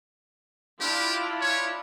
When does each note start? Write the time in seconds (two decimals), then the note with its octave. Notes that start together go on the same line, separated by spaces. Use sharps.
0.81 D4 E4 F4 G4
1.41 C#5